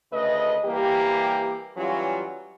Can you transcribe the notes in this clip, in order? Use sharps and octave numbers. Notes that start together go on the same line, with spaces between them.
D2 C#3 A3 B4 D#5
E3 G3 A#3 G4
E3 F#3 G3 C#4 F4